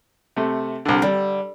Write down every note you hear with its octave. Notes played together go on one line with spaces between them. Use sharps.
C3 A3
C2 D3
D3 G3